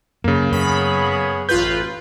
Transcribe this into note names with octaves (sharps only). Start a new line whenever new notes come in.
F#2 C#3 A#3
F#2 B3 G#4 C#5 B5
A1 F4 B4 G6